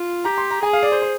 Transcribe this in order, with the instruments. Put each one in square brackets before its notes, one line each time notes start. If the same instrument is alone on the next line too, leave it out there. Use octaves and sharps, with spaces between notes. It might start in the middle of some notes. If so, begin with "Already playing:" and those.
Already playing: [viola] F4
[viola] G4 [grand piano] A#5
[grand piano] C6
A#5
[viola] G#4 [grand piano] G#5
[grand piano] F5
D5
C5
C5